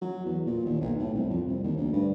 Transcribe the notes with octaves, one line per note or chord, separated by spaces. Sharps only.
F#3
E2
A#2
D#2
B1
A2
C2
F2
C2
D#2
D2
G2